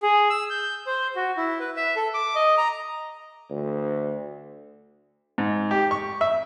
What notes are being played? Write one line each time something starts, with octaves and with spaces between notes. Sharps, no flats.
G#4
E6
G6
C5
F#4
E4
B4
E5
A4
D6
D#5
A#5
D2
G#2
G4
C#6
E5